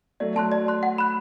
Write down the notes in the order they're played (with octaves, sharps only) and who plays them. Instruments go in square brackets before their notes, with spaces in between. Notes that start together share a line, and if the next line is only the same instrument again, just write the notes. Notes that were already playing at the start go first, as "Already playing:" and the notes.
[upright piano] F#3 A3 [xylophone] D5
[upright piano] F#3 A3 [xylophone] A5 C6 F#6
[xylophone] D5
A5 C6 F#6
F#5
B5 F#6